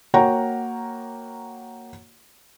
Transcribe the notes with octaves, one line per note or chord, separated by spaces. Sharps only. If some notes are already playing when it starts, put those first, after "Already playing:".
A#3 F#4 C#5 F#5 G5 A#5